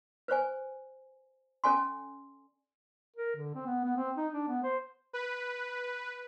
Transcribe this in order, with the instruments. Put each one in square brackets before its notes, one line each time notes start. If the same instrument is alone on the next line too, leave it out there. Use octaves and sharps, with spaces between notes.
[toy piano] B4 C5 D5 G#5
C#4 A4 D5 G#5 C6
[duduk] A#4
D3
C4
B3
B3
C4
D#4
D4
B3
C5
[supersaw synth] B4